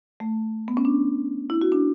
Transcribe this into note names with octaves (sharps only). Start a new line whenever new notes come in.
A3
B3
C#4
D4
E4
F#4
D4